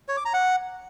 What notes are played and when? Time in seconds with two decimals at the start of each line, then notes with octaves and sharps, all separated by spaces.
0.09 C#5
0.17 D6
0.25 A#5
0.34 F#5